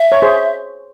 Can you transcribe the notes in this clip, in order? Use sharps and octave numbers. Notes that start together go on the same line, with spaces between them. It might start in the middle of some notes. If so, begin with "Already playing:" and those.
Already playing: E5
C#5
G#4 C5